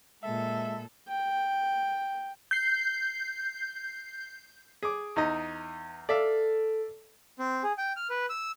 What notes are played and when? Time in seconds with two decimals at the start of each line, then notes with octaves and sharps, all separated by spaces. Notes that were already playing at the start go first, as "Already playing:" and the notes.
0.23 A#2 G#3 A4 E5
1.09 G5
2.51 G6 C7
4.83 G#4 D6
5.16 E2 D#4 D#5
6.09 A4 D5 E5 F5
7.39 C4
7.63 G#4
7.78 G5
7.96 F6
8.10 B4
8.29 E6